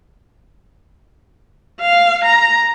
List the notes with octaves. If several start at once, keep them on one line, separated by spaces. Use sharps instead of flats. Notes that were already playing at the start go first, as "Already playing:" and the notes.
F5
A#5